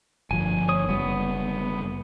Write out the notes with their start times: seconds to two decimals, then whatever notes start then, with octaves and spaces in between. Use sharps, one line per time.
0.31 G1 F3 G#5
0.69 C#5 D#6
0.89 F#1 G3 B3